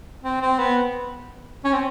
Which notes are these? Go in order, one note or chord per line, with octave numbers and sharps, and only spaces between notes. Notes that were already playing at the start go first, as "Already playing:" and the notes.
C4
C4
B3
C#4
C4